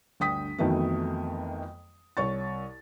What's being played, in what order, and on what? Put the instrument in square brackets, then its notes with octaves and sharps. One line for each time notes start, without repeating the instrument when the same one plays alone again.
[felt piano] G1 D2 G5 D#6 B6
F2 D#3 E3 F#3 A3 B3
C2 C#5 C#6 A6